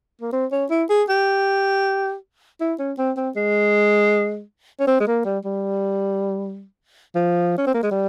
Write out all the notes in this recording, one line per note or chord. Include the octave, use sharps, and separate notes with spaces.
A#3
C4
C#4
E4
G#4
G4
E4
C#4
C4
C4
G#3
C#4
C4
G#3
A#3
G3
G3
F3
C#4
C4
A#3
G#3
G3